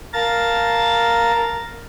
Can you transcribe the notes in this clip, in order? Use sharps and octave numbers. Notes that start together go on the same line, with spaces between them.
A#4 F5 A5 A#5 A6